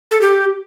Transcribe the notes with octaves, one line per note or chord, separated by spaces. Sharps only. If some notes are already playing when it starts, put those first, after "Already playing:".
A4
G4